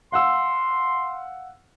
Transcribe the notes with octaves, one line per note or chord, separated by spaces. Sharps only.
F5 F#5 C6 E6